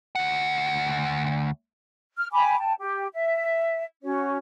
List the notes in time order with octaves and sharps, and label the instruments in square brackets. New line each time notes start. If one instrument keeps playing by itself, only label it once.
[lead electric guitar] D2 F#5
[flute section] F6
G5 G#5 B5 D6
G5 A5
G4 G5
E5
C#4 F#4 C#5